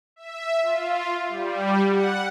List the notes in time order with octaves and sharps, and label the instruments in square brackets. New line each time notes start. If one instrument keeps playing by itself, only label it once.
[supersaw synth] E5
F4
G3
F#5